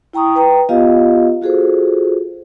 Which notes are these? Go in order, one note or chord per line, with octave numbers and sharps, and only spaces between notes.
E4 G5 A#5 C#6 D#6
B4 G5 A#5
B3 F4 G4 D#5 F5
F4 F#4 G#4 A4 C5